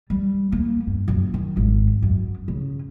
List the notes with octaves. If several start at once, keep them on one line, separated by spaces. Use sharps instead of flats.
G3
A#3
G2
F#1
D#3
G#1
F#2
C#3